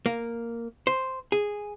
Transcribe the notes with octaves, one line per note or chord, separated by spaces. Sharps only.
A#3
C5
G#4